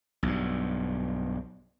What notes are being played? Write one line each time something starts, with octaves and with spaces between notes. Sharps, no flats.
B1 G2